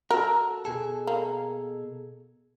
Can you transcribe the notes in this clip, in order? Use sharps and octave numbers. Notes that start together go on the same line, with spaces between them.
F#4 A4 A#4
B2 G#4 A4
A#3